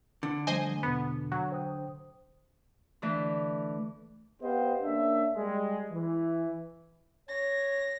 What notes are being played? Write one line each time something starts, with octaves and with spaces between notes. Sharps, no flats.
D3
F3 G3 A3 C5 D#5 G#5
E2 B2 B3
F#3
C5 G5 D#6
D3 E3 A3
B3 C4 G4 C5 D#5 F5
C#3 A#3 D4 E5
G3 G#3
E3
C#5 A#6